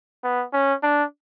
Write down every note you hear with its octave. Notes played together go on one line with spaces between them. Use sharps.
B3
C#4
D4